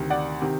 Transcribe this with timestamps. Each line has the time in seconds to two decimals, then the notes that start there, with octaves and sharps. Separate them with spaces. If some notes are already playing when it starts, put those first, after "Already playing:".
Already playing: D2 C3 D#3
0.10 D5 F#5
0.41 C3 D#3